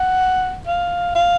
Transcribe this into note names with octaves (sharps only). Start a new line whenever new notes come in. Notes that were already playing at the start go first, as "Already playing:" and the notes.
Already playing: F#5
F5
F5